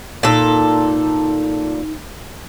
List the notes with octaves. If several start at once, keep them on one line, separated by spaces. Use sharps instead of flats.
A#2 D#4 A4